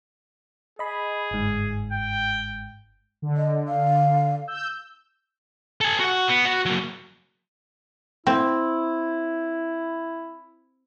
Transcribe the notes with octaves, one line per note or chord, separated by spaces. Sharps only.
G#4 D#5 B5
G1 G#2
G5
D3
D#5
F5
E6 G6
A4 G#5
F#4 F#5
B3
F#4
F#3 A#3
C4 E4